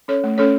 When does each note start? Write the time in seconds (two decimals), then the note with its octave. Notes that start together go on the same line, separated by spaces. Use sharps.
0.08 C#4 A4 C#5
0.24 A3
0.38 C#4 A4 C#5